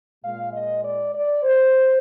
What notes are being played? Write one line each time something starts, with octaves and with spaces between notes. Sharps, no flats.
A#2 G#3 F5
D#5
D5
D5
C5